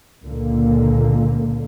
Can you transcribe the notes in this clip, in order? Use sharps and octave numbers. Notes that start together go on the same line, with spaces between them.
C#2 A#2 D3 A#3